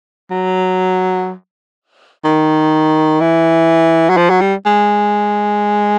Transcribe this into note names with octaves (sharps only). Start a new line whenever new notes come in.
F#3
D#3
E3
F#3
F3
F#3
G3
G#3